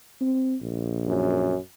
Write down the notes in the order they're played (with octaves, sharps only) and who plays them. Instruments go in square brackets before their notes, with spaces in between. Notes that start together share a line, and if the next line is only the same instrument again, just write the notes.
[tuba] C4
A#1
[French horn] F#2